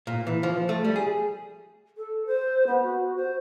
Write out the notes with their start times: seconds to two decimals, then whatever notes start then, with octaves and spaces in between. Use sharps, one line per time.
0.07 A#2
0.27 E3
0.43 F3
0.69 A3
0.85 G3
0.96 G#4
1.97 A4
2.26 C5
2.66 B3
2.82 F#4
3.16 C5